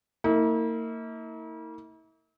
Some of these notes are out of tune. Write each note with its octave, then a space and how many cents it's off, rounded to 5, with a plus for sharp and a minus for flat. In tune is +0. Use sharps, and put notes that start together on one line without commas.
A#3 -30 E4 -45